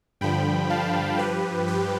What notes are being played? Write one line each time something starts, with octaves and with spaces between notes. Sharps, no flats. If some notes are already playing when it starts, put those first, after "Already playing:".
G2 D3 F3 G5 B5
F5 A5
G2 F3 G4 B4
G4 B4